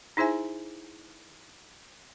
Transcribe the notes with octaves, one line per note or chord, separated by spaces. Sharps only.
D#4 E4 G#4 C5 E5 G#5